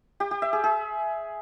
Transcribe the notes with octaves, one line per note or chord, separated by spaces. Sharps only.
G4
G4
E5
G#4
G#4